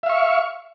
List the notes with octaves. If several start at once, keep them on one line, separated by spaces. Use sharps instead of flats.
E5 F5 C#6